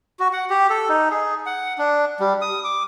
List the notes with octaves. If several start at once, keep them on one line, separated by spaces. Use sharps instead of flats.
F#4
F#5
G4
A4
D#4
G#4
F#5
D4
G3
D#6
D6